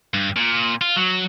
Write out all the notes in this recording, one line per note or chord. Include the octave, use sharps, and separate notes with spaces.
G2
A#2
F4
F#3